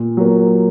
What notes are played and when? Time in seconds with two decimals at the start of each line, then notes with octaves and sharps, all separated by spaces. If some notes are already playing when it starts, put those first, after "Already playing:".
Already playing: A#2
0.17 F#3 A#3